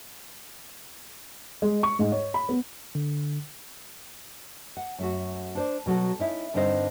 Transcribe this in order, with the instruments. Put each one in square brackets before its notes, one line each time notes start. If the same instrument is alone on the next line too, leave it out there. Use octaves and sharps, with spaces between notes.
[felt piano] G#3
C#6
G#2
C#5
B5
B3
[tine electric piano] D3
[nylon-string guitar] F#5
F#2 A3 F#4
D4 C5 D5
B2 F#3 F#4 A4
C#4 D#4 E4
G2 D3 C4 D#4 C5 D#5